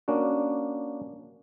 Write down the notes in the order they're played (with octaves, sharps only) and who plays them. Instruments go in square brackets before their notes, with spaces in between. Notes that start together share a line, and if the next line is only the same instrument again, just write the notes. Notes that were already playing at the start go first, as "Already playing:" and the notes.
[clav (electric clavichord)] A#3 C#4 D4 F#4